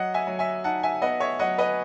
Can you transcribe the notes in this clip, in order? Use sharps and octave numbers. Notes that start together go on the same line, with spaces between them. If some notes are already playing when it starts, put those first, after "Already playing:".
Already playing: F#3 D#5 F#5
E5 G#5
F#3
E5 G#5
D#4 F#5 A5
E5 G#5
B3 D#5 F#5
C#5 E5
F#3 D#5 F#5
B4 D#5